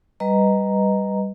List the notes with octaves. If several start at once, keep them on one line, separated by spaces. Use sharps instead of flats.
G3 B4 D#5 A#5